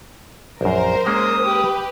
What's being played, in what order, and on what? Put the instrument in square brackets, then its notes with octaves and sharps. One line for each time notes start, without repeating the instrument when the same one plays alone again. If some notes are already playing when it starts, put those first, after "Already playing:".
[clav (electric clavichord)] A#1 F#2 [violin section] A#4 C5
[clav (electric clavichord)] G#3 A#3 C#4 [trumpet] D#6
[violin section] G4 B4